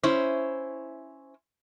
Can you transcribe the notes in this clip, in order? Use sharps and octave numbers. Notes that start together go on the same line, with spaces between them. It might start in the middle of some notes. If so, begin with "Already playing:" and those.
C#4 E4 C5